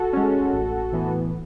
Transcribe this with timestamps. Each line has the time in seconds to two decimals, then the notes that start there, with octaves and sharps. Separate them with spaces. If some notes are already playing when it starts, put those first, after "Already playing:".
Already playing: F#4 A4
0.13 G#3 C#4
0.53 A1
0.92 A2 E3 B3